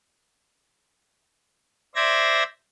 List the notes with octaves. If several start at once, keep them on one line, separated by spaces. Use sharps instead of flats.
C5 D5 E5 G#6 A#6